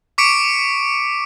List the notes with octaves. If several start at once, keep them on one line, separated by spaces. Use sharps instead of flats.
C#6 D6 B6 C#7 D7